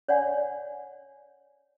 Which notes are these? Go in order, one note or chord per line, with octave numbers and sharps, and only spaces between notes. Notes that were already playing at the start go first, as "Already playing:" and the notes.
C#5 D5 F#5 G#5